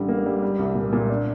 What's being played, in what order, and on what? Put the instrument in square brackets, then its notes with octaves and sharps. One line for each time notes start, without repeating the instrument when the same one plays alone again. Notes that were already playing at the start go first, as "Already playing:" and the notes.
Already playing: [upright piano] A1 D3 G3
A#3
G3
G3
C2
A#2
A#2
D4